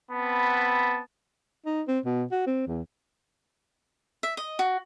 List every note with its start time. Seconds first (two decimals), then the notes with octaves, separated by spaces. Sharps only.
0.12 B3 C4 F#5 A5 B5
1.66 D#4
1.88 C4
2.05 B2
2.32 F#4
2.47 C4
2.67 E2
4.23 E5
4.37 D#5
4.59 F#4